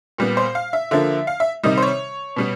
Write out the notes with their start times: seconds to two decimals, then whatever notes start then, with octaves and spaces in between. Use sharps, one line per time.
0.18 A#2 G3 B3
0.37 C5
0.55 F5
0.73 E5
0.91 D3 F3 A#3 E5
1.27 F5
1.40 E5
1.63 C3 D#3 G3 D#5
1.78 C5
1.82 C#5
2.36 B2 G3 B3